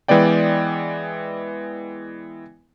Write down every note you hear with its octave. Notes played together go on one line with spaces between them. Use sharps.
E3 G#3 B3 D5 G5